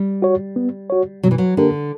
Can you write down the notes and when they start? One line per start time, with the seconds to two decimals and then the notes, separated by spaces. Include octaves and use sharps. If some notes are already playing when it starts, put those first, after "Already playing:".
Already playing: G3
0.22 F#4 C#5
0.56 B3
0.90 F#4 C#5
1.23 B2 F#3
1.31 E3
1.38 F#3
1.57 D3 A#3 D4 G4 A#4